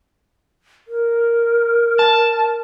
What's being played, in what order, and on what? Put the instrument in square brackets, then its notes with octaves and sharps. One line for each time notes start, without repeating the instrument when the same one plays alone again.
[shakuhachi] A#4
[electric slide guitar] A5